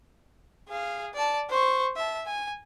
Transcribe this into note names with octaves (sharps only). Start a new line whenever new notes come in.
G#4 F5
D5 A5
C5 C#6
E5 A5
G#5